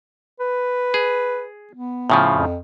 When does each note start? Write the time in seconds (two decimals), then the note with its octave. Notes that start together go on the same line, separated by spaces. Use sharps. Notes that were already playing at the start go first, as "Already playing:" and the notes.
0.40 B4
0.94 G#4
1.73 B3
2.10 A2 C#3 F3
2.33 F2